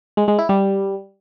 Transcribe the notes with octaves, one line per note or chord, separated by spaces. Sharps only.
G#3
G#3
E4
G3